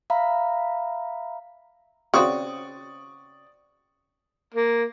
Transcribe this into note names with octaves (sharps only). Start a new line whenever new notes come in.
E5 F5 A#5 B5
C#3 C4 F#4 D5 C#6 D#6
A#3